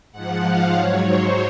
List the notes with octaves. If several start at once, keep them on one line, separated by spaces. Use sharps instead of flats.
G#2 F3 F#5
F5
G#2 F#3 C#5
C5